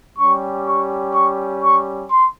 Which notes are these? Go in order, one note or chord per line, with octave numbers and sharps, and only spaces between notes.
G3 C#4 G4 C#6
C#6
C#6
C#6
C6